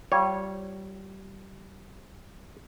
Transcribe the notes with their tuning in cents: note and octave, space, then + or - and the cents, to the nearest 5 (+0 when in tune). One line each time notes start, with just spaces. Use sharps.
G3 -25 F4 +0 C#5 -10